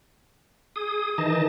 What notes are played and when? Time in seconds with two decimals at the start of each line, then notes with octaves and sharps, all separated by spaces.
0.76 G#4 D#6
1.18 D#3 E3 D#4 D#5 A5